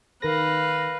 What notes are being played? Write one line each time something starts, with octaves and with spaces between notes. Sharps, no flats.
D#3 A#4 B4 F5 A#6